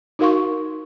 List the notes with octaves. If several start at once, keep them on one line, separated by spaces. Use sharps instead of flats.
D#4 F#4 A#4 F5 C6 C#6